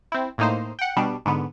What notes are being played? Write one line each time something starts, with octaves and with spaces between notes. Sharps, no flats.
C4 E4
A2 A#3 D#4 C5
F#5 G5
B2 G3 D4
G#2 D3 B3